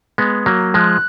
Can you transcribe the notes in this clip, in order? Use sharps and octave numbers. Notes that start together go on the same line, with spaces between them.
G#3 B3
F#3 A#3
F3 G#3 F#6